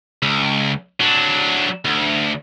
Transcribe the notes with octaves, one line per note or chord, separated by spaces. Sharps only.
C#2
F#3 D4
D2